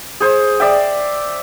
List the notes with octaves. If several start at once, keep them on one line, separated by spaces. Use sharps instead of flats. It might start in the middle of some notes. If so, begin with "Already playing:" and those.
G#4 C5
D5 E5 G5